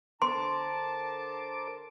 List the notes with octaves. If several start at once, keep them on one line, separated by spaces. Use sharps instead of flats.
D3 A#4 C5 A5 C6 D6